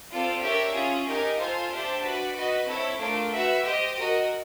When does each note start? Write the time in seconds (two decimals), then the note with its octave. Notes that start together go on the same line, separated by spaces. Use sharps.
0.11 C4 F4 A4 D5
0.42 D4 G4 A#4 C#5 E5
0.74 C#4 F4 G#4
1.07 D#4 G4 A#4 D#5 G#5
1.38 F4 A4 C5 F5 G#5
1.70 D4 G4 C5 E5 A5
2.02 F#4 B4 D5
2.35 F#4 B4 D#5
2.67 C4 E4 A4 C#5
2.98 A3 D4 F4 A#4
3.31 F#4 B4 E5
3.63 G4 C5 D#5
3.95 F#4 A#4 D#5